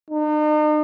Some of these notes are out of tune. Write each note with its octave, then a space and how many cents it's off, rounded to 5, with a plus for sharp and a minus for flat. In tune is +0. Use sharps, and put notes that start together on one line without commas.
D#4 -40